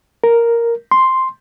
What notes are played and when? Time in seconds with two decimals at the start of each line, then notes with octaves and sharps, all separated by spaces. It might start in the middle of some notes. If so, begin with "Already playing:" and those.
0.24 A#4
0.91 C6